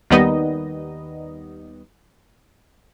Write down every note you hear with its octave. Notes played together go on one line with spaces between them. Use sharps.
D#2 D#3 G3 B3 D#4 D#5